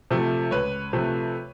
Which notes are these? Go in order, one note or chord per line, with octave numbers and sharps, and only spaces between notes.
C3 F3 A3
C#2 B4 C#5
C3 F3 A3